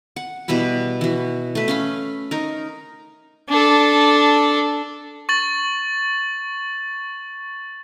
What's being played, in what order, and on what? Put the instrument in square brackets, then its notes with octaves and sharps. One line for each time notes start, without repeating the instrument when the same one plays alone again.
[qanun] F#5
B2 E3 G3 B5
E3 F#4
A3 B4
C#4 F5 B5
D#4 A#4
[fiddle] D4 A4
[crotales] C#6 A6 F#7